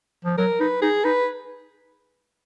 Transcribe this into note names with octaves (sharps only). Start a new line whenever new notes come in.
F3
F#3 A#4
D#4 B4
D#4 G#4
D#4 B4